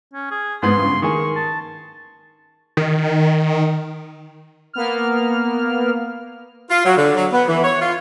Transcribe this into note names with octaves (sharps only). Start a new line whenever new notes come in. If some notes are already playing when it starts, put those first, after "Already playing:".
C#4
G#4
G#2 G#3 B3 C6
G2 C#3
D#3 A#3 G#4 C#6
A5
D#3
A#3 B3 F6
F4
F#3
D3
F#3
B3
E3
C#5
F4